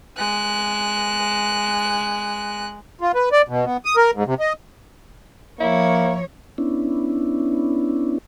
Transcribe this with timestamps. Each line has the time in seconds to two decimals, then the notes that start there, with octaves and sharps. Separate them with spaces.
0.17 G#3 F#6
3.01 F4
3.15 B4
3.32 D5
3.48 B2
3.65 B3
3.85 D#6
3.97 A#4
4.15 G#2
4.27 C3
4.40 D#5
5.60 F3 A#3 E4 C#5
6.58 B3 C#4 D4 E4